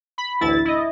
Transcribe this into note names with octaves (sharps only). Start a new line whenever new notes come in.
B5
A1 D2 E4 A6
E4 D#5